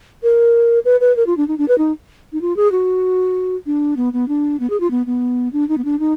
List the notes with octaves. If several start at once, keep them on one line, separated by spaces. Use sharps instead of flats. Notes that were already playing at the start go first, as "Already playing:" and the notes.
A#4
B4
B4
A#4
F4
D4
D#4
D4
B4
D#4
D#4
F4
G#4
F#4
D4
B3
B3
D4
B3
G#4
F4
B3
B3
D4
D#4
B3
D4
D#4